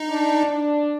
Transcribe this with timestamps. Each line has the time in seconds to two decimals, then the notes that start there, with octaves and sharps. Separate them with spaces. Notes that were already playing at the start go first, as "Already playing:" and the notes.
Already playing: D#4
0.08 D4
0.51 D4